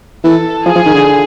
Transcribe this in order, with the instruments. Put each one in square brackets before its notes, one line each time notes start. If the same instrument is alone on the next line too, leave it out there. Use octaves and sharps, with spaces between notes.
[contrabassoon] E3 [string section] A4
[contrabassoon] F3 [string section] G#4
[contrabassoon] F3
D#3
D3